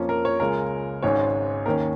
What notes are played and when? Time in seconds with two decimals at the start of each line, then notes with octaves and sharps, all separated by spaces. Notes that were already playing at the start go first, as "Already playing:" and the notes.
Already playing: F2 F3 A#3 C#4
0.09 A#4
0.25 C#5
0.40 C#2 C#3 G#3 A#4
1.02 G#1 G#2 G#3 C#4 C#5
1.66 D#2 D#3 C#4 A#4